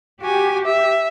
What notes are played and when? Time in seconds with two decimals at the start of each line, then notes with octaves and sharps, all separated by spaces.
0.23 F#4 G4 G#5
0.65 E5